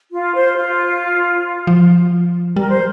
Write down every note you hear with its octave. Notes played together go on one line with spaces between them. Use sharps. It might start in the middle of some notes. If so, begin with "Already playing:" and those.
F4
C5
F4
F3
G3 A#4
C5